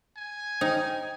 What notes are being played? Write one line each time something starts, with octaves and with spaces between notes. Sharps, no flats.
G#5
D#4 C5 G5